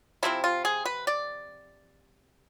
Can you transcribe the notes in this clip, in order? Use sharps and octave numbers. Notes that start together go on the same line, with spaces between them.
C3 F3 G#3 C4 E4
F4
G#4
B4
D5